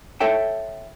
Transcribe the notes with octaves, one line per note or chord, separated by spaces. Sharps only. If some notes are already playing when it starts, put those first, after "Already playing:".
A4 C#5 E5 G5